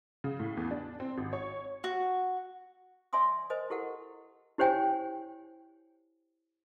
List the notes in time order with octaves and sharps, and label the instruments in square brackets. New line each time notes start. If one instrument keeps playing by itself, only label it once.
[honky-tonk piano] C#3
A2
E2
D4
C4
G#1
C#5
[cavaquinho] F#4
[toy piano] D5 E5 G#5 C6 D#6
A#4 C5 D#5 G#5 D#6
E4 G4 A4 A#4 F#5
E4 G4 C5 C#5 G5 G#5